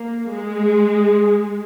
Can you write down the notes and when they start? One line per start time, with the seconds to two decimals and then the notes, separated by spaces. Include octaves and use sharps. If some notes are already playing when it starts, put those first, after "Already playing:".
Already playing: A#3
0.33 G#3